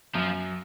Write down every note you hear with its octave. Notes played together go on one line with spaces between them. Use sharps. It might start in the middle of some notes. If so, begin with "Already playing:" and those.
F#2 F3